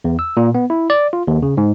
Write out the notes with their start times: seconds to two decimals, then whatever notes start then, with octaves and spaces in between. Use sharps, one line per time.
0.04 E2
0.19 E6
0.37 A#2
0.55 B3
0.70 E4
0.90 D5
1.13 F4
1.28 D#2
1.42 C#3
1.57 G#2